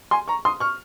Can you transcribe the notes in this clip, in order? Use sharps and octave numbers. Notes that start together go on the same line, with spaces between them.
G#5 C6
A#5 C#6
C6 D#6
C#6 F6